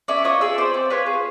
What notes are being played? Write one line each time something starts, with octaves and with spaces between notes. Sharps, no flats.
C#4 D5 E5
F4 C#5 D#5
G#4 D5 E5
C4 C5 D5
C4
F4 B4 C#5
G#4